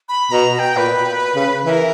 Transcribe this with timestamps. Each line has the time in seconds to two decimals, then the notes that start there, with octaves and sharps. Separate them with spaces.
0.09 B5
0.32 B2 A#5
0.55 A#5
0.59 G5
0.77 A#2 B4
1.36 C#3
1.65 E3 B4
1.69 A#4